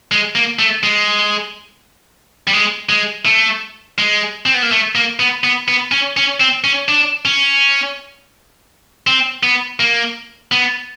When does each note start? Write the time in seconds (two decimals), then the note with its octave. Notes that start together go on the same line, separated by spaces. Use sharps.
0.11 G#3
0.35 A#3
0.59 A3
0.83 G#3
2.47 G3
2.53 G#3
2.89 G#3
3.25 A3
3.98 G#3
4.46 C4
4.54 B3
4.63 A#3
4.71 A3
4.95 A#3
5.20 B3
5.44 B3
5.68 B3
5.92 C#4
6.17 C#4
6.40 C4
6.64 C#4
6.88 D4
7.25 C#4
9.07 C4
9.43 B3
9.80 A#3
10.52 B3